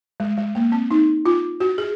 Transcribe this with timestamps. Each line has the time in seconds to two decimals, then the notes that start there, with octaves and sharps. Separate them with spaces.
0.20 G#3
0.38 G#3
0.55 A#3
0.72 C4
0.90 D#4
1.26 F4
1.60 F#4
1.78 G#4